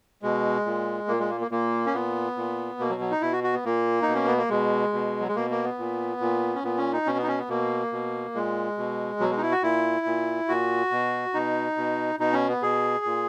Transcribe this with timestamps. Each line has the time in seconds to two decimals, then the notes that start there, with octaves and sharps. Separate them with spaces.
0.22 B2 G#3
0.65 A#2
1.08 A#2 A#3
1.19 G#3
1.30 A#3
1.41 A#3
1.51 A#2 A#3
1.86 C#4
1.94 A#2 B3
2.37 A#2
2.79 B2 A#3
2.90 F#3
3.01 F#3
3.11 D#4
3.21 B2 E4
3.33 F#4
3.44 F#4
3.53 B3
3.65 A#2 A#3
4.02 D#4
4.08 B2
4.15 C#4
4.27 B3
4.38 A#3
4.50 B2 G#3
4.93 B2
5.20 F#3
5.28 G#3
5.36 B2 A#3
5.50 A#3
5.64 B3
5.79 A#2
6.20 A#2
6.55 C#4
6.64 A#2 B3
6.77 C#4
6.93 D#4
7.06 B2 C#4
7.18 B3
7.23 D#4
7.28 C#4
7.38 B3
7.49 B2 A#3
7.92 B2
8.34 A#2 G#3
8.77 B2
9.20 B2 F#3
9.30 G#3
9.37 D#4
9.42 E4
9.52 F#4
9.63 A#2 E4
10.06 A#2
10.48 A#2 F#4
10.91 B2
11.34 B2 D#4
11.77 B2
12.19 B2 D#4
12.33 C#4
12.48 B3
12.62 B2 G#4
13.05 A#2